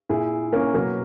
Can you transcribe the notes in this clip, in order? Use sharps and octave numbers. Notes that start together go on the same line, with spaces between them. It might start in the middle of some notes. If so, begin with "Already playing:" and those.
A#2 E4 G#4
A#3 C#4
B2 F#3 A#3